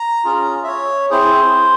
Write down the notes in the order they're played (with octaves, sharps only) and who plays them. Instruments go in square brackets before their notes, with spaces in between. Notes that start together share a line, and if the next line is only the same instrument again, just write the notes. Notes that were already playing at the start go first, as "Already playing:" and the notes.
Already playing: [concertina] A#5
C#4 F4 G#4
E5
C#5
C4 E4 G#4 C5